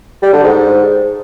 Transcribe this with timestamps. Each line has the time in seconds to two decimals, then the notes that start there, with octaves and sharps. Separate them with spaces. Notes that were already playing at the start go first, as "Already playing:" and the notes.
0.22 G3
0.33 D3
0.44 G#2